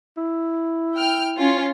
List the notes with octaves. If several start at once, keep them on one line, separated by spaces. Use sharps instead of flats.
E4
G5 F6
C#4 F4